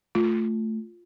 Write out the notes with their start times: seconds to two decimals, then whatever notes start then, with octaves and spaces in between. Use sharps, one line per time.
0.15 A3 F4